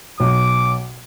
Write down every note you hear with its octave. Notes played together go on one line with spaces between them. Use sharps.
B1 D6